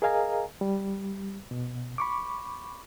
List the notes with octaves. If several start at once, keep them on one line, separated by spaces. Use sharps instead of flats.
G#4 A#4 D#5 F5 G#5 A#5
G3
B2
B5 C#6 D6